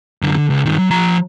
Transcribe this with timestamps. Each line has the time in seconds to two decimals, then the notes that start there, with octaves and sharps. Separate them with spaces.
0.22 F#2 D3
0.37 D3
0.50 C#2
0.66 G2 D#3
0.78 F#3
0.91 F3 A#5